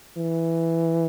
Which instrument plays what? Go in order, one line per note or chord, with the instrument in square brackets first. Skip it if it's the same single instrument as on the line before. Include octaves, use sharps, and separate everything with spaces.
[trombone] E3